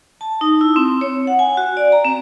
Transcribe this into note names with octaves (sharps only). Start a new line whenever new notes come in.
A5
D#4
E4
C4
C#5
F#5
G#5
F#4
D5
A#5
C4